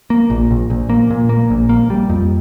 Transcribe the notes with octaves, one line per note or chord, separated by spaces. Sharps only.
A#3
A#1
A#1
A#1
A#3
A#2
A#3
A#1
A#3
G3
F2